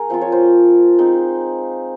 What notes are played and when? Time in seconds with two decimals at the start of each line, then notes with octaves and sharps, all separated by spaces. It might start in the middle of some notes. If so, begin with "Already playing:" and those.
Already playing: A#3 G#4 A#4
0.09 F3 C4 F4 C5
0.21 C#5
0.32 C5
0.99 G#3 C4 D#4